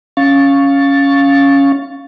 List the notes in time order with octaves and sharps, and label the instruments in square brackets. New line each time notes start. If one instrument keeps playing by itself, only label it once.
[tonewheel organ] C#4 F5 C#6 A6